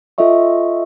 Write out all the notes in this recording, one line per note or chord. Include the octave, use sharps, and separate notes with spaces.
F4 A4 D#5 E5 C#6